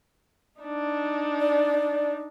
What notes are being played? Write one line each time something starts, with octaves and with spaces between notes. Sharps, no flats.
D4 D#4
D5